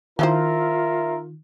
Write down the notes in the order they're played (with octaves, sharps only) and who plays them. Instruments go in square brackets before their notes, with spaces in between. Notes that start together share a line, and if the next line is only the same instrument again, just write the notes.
[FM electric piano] D#3 [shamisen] F3 E4 C5 [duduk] F4 [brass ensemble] A#4 E5